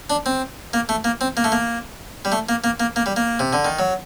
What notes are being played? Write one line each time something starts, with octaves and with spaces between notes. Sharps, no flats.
D4
C4
A#3
A3
A#3
C4
A#3
A3
A#3
G3
A3
A#3
A#3
A#3
A#3
G3
A#3
C3
D3
D#3
F#3